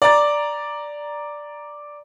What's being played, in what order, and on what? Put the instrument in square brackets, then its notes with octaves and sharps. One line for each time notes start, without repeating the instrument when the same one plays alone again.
[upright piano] D5 A#5 A6